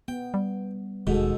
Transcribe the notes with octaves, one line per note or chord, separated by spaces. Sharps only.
B3 G5
G3
D#1 G#2 B2 G#3 A4